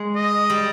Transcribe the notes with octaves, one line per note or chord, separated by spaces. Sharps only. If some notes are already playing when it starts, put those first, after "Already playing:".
Already playing: G#3
D#5
G3